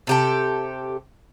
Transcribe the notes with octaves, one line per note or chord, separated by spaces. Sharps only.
C3 G4 A4